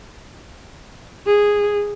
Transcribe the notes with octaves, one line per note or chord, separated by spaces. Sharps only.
G#4